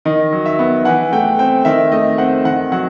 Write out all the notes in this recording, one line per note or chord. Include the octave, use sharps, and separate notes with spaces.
D#3 D#5
F#3
E5
B3
E3 F#5
A3 G5
C4 G5
D#3 E5
A3 D#5
C4 F#5
D#3 F#5
F#3 F#5